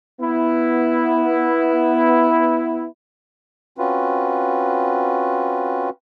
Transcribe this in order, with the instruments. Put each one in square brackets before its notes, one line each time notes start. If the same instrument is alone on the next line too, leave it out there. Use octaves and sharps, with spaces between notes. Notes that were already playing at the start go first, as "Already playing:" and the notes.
[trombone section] B3 E4
[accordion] C4 C#4 F4 F#4 B4